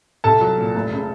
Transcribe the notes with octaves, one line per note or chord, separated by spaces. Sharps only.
C2 A4 A5
F#3
A#2
F1
C#3